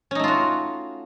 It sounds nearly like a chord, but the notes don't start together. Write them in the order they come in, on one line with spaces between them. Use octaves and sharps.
C#4 D#4 A3 F4 F#4